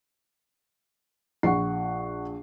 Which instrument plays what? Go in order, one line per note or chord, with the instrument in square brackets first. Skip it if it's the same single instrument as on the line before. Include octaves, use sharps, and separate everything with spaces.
[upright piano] A#1 [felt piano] F#5 C#6 C7